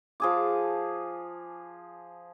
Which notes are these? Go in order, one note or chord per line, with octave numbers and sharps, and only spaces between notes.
F3 G#4 D6